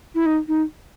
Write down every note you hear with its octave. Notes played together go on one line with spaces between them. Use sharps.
E4
D#4
D#4